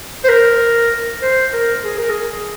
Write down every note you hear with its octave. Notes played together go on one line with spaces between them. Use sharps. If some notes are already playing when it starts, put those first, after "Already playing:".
C5
A#4
C5
A#4
G#4
A#4
G#4